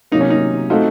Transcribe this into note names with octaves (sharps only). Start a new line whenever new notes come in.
C3 F#3 A#3 D#4
C#4
D#4
A3 C4 D#4 F4 F#4 A4